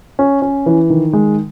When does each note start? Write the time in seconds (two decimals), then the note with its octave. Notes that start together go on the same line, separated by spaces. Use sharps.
0.19 C#4
0.42 C#4
0.66 E3
0.90 D#3
1.13 G#3